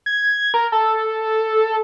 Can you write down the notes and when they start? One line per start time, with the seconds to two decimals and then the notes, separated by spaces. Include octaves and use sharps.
0.06 G#6
0.54 A#4
0.72 A4